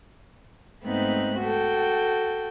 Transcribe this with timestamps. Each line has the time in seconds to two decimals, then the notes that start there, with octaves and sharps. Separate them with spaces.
0.84 G#2 A3 B3 C4 D#4 F#6
1.40 F#4 A4 G5